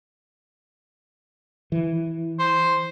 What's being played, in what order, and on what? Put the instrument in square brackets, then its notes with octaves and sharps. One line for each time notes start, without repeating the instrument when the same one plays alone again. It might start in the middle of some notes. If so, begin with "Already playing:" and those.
[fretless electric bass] E3
[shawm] C5